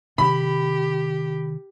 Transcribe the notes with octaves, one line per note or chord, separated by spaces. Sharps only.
C3 D#3 G4 B5